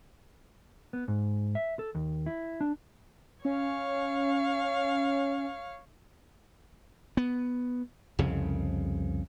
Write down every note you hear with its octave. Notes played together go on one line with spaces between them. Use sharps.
B3
G#2
E5
A4
D#2
E4
D4
C#4 C#5 F5
B3
C2 F2 C#3